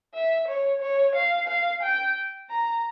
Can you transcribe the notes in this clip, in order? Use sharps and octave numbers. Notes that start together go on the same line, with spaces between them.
E5
C#5
C#5
F5
F5
G5
A#5